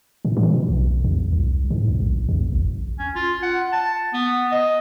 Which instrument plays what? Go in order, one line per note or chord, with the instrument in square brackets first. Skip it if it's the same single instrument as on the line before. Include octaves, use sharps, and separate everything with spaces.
[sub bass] A2
E3
B2
B1
E2
C2
G#2
C#2
A#1
E2
A1
[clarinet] C#4
F4
F#5
A5
B3
D#5